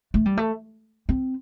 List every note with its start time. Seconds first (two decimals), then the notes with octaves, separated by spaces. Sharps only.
0.14 A3
0.25 G3
0.37 A3
1.09 C4